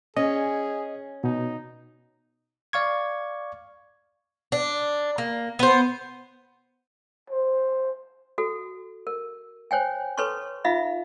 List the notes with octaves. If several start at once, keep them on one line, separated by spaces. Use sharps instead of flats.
C#4 G#4 D#5
B2 D#4
D5 F5 C#6 G#6
D4
A#3
B3 C5
C5
F#4 A4
A#4
C5 C#5 G5 G#5
A4 B4 C#5 A5 C6 C#6
D#4 F4 E5 F5 B5